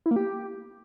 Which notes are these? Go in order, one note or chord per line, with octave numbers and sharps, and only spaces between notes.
E4
A#3
G4